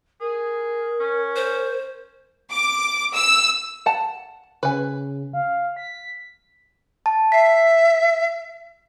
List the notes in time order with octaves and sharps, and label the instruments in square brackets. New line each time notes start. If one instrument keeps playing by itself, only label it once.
[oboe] G#4 [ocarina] A#4
[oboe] C#4
[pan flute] C5
[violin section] D6
E6
[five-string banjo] F#5 A5
[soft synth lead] C#3 [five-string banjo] B4 G#5
[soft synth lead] F5
B6
[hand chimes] A5
[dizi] E5 [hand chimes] B6 C7